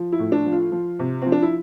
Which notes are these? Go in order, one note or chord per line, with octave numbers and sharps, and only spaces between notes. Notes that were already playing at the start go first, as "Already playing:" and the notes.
Already playing: F3
E4
A2
D4
F3
F4
F3
C3
F3 C4
D4
E4